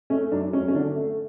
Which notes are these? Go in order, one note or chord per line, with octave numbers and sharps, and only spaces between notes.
A3 C#4
F#2 D4
F#2 C#4
C#4
D3 D4
A3